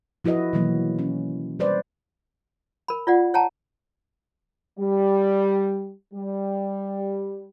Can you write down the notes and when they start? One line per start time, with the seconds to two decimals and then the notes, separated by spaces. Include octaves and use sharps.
0.25 F3 E4 F#4 B4 D#5
0.53 B2 D#3 E3 F#3 A#3
0.99 C#4
1.59 G3 B4 C5 D5
2.88 A#4 B5
3.07 F4 D5 F#5
3.34 C#5 F#5 G5 A5 A#5
4.79 G3
6.14 G3